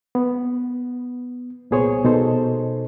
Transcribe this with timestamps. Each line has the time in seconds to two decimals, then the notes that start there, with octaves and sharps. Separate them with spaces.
0.15 B3
1.71 C2 A#2 B3 G#4 C5 C#5
2.05 B2 D#4 A4 C5